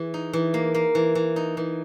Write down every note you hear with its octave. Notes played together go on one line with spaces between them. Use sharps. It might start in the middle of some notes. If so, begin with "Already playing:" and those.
Already playing: E3 G#4
D#4
E3
A#3
A#3
E3
E3
D#4
E3